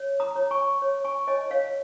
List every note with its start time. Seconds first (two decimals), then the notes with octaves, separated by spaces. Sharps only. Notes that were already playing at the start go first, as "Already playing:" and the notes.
Already playing: C#5
0.20 A#5 D#6
0.35 C#5
0.51 G#5 C#6
0.82 C#5
1.04 G#5 C#6
1.27 C#5 D#5 G#5
1.51 C#5 F5